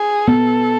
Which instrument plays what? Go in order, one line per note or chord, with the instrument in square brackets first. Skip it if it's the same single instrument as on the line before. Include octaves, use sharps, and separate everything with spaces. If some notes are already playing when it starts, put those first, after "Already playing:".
Already playing: [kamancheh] G#4
[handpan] B3 [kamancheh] A4